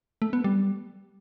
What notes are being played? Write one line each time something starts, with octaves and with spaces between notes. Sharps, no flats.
A3
B3
G3